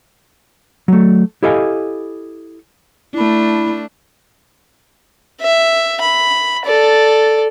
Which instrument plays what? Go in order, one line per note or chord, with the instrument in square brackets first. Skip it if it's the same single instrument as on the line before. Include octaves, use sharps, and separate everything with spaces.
[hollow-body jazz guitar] F#3 A3
E4 G4 A4 D#5 F5 G#5
[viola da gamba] A3 D4 [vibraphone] E4 B5
[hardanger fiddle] E5
B5
A4 D5